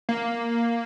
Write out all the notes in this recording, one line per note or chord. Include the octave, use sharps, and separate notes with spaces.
A#3